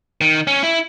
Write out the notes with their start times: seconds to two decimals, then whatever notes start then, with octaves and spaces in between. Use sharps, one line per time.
0.21 D#3
0.47 C#4
0.63 E4